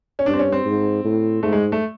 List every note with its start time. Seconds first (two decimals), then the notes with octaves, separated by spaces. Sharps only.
0.19 C#4
0.26 G2 D4
0.33 C4
0.39 C#4
0.52 C4
0.65 G#2
1.04 A2
1.43 G#2 A3
1.53 G#3
1.72 A3